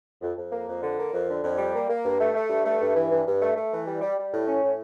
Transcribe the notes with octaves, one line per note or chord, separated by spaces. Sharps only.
F2
F2
A#3
F2
D3
A#3
F2
D3
F2
G3
A#3
A#3
G2
A3
A3
G2
A3
G2
E3
G2
G2
A3
A3
E3
G3
G3
G3
A2
C#4
A2